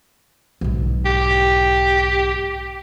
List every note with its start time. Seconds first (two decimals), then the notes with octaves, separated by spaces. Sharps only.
0.61 B1 G#2
1.05 G4